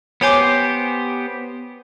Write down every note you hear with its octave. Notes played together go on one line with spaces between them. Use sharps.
B3 G4 C5 C#5 G#5 D6